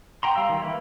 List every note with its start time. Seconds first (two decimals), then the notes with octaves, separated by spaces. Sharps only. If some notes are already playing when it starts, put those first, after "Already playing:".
0.23 G5 A#5 C6
0.36 G3 F5 E6
0.49 D#3
0.62 E3 A#3 E4